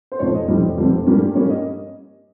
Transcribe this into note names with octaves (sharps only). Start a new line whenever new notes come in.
C5
F1 F2 C#3 F3 G#3 C#5
D#5
F1 F2 C#3 G3 C4
F1 F2 C#3 G3 C4
G2 G3 A#3 C#4
G2 G3 A#3 C#4 C#5
D#5